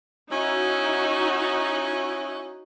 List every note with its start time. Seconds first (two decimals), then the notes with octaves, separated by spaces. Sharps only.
0.31 C#4 D#4 E4 F#4